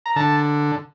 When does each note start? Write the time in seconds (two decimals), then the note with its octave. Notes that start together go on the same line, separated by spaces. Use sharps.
0.06 A#5
0.16 D3 A5